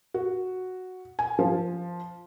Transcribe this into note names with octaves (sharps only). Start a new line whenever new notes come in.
F#4
G#5
F3